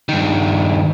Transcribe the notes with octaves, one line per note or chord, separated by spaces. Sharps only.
G2 D#3